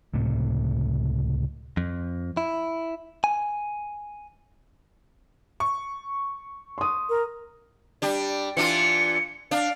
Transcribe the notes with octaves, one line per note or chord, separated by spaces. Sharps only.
C#2 A2 C3
F2
E4
G#5
C#6
C6 D#6
A#4
G3 D4
E3 D4 F4 C#7
D4 F5